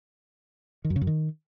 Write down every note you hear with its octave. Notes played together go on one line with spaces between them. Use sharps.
D#3
F#2
C#3
F#2
D#3